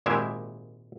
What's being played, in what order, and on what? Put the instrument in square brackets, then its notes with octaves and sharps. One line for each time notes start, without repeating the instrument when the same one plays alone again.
[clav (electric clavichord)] G#1 A#2 G#3 E4 G4 E5